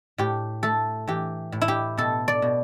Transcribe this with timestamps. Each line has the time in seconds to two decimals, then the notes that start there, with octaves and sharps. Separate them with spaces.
0.18 A2 G4
0.63 A3 A4
1.07 E3 G4
1.52 A2
1.61 E4
1.68 G4
1.97 B2 A4
2.28 D5
2.42 B2